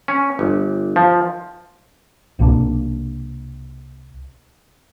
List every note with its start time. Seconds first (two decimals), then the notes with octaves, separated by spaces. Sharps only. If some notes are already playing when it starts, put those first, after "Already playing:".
0.08 C#4
0.39 G1
0.96 F3
2.39 C2 B2 A#3 D4